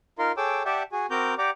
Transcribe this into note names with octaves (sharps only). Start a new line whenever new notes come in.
D#4 F4 A#4 C6
G#4 A4 C#5 G5 D6 E6
G4 D5 E5 F#5 G5 A5
F#4 G#4 G#5
C4 F#4 A#4 A#5 D6 G6
G4 D5 F#5 G5 A#5 D6